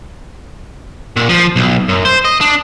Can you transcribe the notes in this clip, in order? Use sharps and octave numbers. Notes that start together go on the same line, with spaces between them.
A#2
F3
B1
F#2
C5
D#5
D4